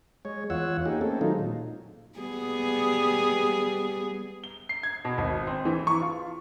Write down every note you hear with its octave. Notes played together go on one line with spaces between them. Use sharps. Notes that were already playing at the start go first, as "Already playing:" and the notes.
G#3 C#5
E2 F4 C#5 F#5 E6
A#3 D#4 G4 G#4
A3 A#3 C4 C#4 A4
D#3 F#3 G#3 D#4 F4
A#2
G3 B3 G#4
G7
C7
G#6
B2
G#1
C4
E3
C#6
F4